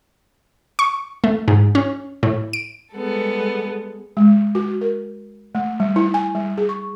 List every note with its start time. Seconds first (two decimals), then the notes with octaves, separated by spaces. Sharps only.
0.79 C#6
1.24 A3
1.48 G#2
1.75 C#4
2.23 A2
2.53 D7
2.95 G3 G#3 B3 A4
4.17 G#3
4.55 F#4
4.81 A#4
5.55 A3
5.80 G3
5.96 E4
6.14 G#5
6.35 G3
6.58 G#4
6.69 C#6